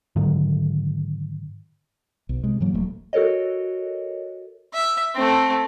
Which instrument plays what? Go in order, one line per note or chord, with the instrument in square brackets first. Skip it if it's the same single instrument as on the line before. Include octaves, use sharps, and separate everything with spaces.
[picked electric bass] G#2 D3 D#3 F#3
[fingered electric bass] B1
C3 G#3
G#2 E3 F#3 A#3
D#1 F#3 A3
[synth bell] F#4 A4 A#4 C#5 D#5
[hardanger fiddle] E5
A3 C4